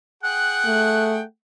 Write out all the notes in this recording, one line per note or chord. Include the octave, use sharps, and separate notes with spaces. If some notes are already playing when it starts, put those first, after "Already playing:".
G#4 F#5 G5 F#6
A3